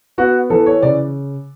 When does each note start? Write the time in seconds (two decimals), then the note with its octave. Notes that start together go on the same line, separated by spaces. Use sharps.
0.18 B3 F#4
0.50 E3 A4
0.66 C#5
0.82 C#3 D5